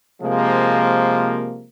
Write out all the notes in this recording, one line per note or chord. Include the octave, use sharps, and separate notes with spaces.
C3 F3 G#3 A#3